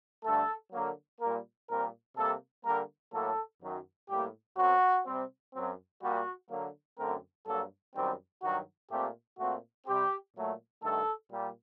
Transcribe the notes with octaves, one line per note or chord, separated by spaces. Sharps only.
G2 D3 A3 A4
D3 F#3 A#3
A#2 G3 A#3 A#4
A#2 G3 C4 A#4
C3 G3 A#3 A4
D3 G3 A#3 A#4
A2 F#3 A#3 A4
F#2 D#3 F#3
A2 G3 A#3 G4
F#2 F#3 C4 F#4
C3 G3 C4
F#2 F#3 C4
A#2 G3 A#3 F#4
D3 F#3 A#3
F#2 D3 A3 C4 A#4
G2 F#3 A#3 A4
F#2 D#3 G3 C4
G2 D#3 F#3 F#4
A#2 A3 C4 G4
A#2 A3 C4 F#4
C3 G3 C4 G4
A#2 F#3 A3
G2 D#3 A3 A4
A#2 G3